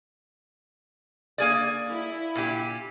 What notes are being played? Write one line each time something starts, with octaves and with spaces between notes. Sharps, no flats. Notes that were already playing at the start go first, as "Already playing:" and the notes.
A#3 G#4 D5
E4
A#2 G4